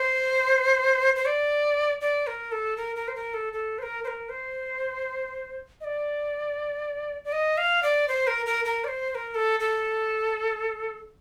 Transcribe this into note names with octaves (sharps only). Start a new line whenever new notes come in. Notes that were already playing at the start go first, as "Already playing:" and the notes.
Already playing: C5
C5
D5
D5
A#4
A4
A#4
A#4
C5
A#4
A4
A4
C5
A#4
C5
A#4
C5
D#5
D5
D5
D#5
F5
D5
C5
A#4
A#4
A#4
D5
C5
C5
A#4
A4
A4